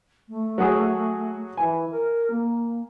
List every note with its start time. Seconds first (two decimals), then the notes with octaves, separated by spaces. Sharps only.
0.29 A3
0.58 F#3 F#4 G#4
1.57 E3 G#5
1.90 A#4
2.30 A#3